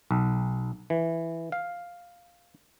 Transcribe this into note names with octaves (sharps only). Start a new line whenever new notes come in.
B1
E3
F5